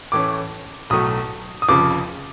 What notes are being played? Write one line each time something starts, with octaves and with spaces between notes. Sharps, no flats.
A2 E3 A3 C#4 D6
B1 A2 F#3 A3 D#6
D#6
F1 F2 C#3 F3 D6